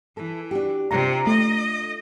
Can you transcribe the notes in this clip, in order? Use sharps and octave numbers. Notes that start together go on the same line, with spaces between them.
E3 E4 A4
D4 F#4 G4
C3 D4 F4 A#5
A3 D#5